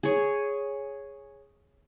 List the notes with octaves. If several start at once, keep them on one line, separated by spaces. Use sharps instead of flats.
G#4 C#5